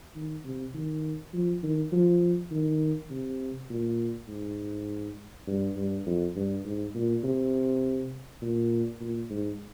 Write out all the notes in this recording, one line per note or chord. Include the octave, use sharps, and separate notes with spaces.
D#3
C3
D#3
F3
D#3
F3
D#3
C3
A#2
G#2
G2
G2
F2
G2
G#2
A#2
C3
A#2
A#2
G#2